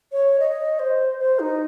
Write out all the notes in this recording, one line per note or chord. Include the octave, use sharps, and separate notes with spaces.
C#5
D#5
C5
C5
D#4